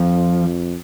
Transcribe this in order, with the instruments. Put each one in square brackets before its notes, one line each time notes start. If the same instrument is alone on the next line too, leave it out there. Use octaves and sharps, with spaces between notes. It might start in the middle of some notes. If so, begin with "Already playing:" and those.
Already playing: [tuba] F2 [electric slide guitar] F3